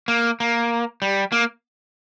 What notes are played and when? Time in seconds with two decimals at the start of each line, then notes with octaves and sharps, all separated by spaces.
0.08 A#3
0.40 A#3
1.02 G3
1.32 A#3